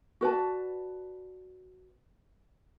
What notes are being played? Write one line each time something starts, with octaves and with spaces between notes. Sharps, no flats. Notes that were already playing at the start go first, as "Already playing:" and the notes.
F#4 B4 D5 A5